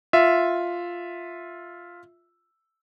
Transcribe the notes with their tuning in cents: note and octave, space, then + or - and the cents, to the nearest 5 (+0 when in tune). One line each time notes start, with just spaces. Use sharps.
F4 +0 E5 +0